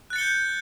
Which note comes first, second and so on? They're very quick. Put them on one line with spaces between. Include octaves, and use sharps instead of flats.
F#6 A6 C#7 G7 G6